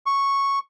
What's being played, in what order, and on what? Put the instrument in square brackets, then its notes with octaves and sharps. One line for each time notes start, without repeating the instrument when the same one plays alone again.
[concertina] C#6